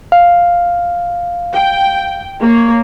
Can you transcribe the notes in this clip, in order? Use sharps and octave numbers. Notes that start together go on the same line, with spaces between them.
F5
G5
A#3 C#5